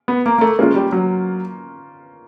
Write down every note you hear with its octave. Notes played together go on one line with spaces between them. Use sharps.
B3
A#3
A#3
A3
G#3 A#3 C#4 F4
G3
F#3